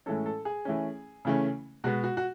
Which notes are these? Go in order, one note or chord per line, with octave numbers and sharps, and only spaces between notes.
A2 E3 G#3 C#4 A4
A4
G#4
E3 A3 C#4
C#3 E3 A3 C#4
B2 G#3 B3 F#4
F#4
F#4